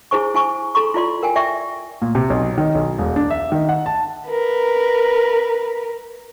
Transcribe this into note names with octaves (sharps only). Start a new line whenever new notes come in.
E4 G#4 C5 G#5 C#6
E4 G#5 C#6
A4 A#5 C6 C#6
E4 F4 D5 C6
A#4 G5 G#5
D5 E5 G5 C#6
A#2
C3
B1
D#3
B1
E1
D4
E5
D#3
F#5
A5
A#4 B4